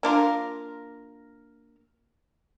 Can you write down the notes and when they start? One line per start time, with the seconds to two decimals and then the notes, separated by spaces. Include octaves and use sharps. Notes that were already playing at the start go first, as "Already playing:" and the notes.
0.03 A#3 D4 F4 A#4